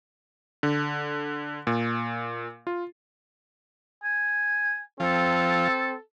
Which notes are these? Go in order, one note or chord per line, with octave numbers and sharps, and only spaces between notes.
D3
A#2
F4
G#5
F3 C4 A4